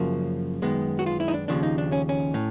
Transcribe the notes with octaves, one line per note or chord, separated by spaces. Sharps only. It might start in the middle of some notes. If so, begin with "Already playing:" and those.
Already playing: F#2 C#3 F3 A#3 F#4
F#2 D#3 G#3 B3
F#4
F4
E4
D#4
D4
D#2 C#3 F3 D4
D#4
D4
C#4
C#4
A2